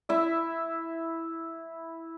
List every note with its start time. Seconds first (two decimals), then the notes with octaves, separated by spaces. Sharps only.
0.09 E4 E5